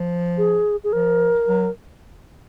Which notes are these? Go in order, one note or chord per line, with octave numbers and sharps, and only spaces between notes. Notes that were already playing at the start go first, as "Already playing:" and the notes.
Already playing: F3
G#4
G#4
F3 A#4
F#3